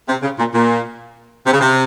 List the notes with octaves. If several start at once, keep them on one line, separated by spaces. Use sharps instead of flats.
C3
C#3
A#2
A#2
C3
C#3
C3